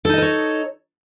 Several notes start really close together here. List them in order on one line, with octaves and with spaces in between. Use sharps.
A4 D#4 D#5 A#4 C#5